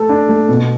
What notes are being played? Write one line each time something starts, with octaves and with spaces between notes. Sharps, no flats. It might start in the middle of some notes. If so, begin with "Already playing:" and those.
Already playing: A3 A4
D4
A3
B2